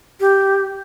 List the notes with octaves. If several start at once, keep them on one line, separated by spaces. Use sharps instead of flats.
G4